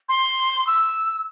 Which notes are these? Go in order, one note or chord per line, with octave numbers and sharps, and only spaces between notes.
C6
E6